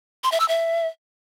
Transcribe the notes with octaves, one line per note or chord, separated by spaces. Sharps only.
C6
E5
E6
E5